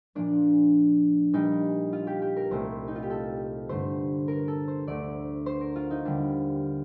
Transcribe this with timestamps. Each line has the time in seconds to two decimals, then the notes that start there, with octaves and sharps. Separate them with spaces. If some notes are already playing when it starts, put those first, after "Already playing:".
0.15 A#2 F3 A#3 D4
1.33 A#2 G3 A#3 D#4
1.93 F4
2.07 G4
2.22 G4
2.36 A#4
2.51 C2 A#2 A3 C5
2.88 D#4
2.95 F4
3.03 G4
3.10 A4
3.69 G2 D3 A3 C5
4.28 A#4
4.48 A4
4.68 C5
4.87 D2 D3 A3 D5
5.46 C5
5.61 A#4
5.76 F4
5.91 D#4
6.05 D#2 D3 G3 A#3 D4